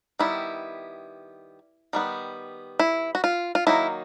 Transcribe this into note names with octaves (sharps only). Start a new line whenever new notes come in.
D#3 G3 B3 E4
D#3 G3 B3
E4
F#4
F4
F4
D#3 F#3 A#3 D#4 E4